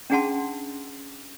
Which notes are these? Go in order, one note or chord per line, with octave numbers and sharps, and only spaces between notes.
C#4 D4 G#4 F#5 A5 C6